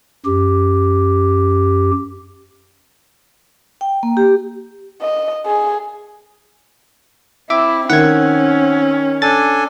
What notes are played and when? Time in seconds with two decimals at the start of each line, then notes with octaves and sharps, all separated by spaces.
0.26 F#2 G4
3.81 G5
4.03 A#3
4.17 G4
5.02 D#5
5.46 G#4
7.50 C4 E4 E5 D6
7.90 D#3 C#4 F#5 G#6
9.22 D4 A4 G#5 A6